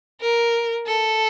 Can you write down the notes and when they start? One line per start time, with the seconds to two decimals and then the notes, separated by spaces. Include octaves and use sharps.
0.21 A#4
0.88 A4